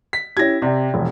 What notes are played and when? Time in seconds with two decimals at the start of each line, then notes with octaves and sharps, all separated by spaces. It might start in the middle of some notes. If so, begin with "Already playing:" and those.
0.13 B6
0.37 C#4 E4 G4 G#6 A#6
0.62 C3 D5 G5
0.94 E1 A#1